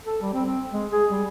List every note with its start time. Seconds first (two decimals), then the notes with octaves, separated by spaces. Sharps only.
0.04 A4
0.21 G3
0.33 C4
0.45 C4
0.71 G#3
0.91 G#4
1.10 G3